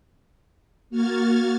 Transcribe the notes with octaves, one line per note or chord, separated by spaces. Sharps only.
A#3 F#4 F6 G#6 A6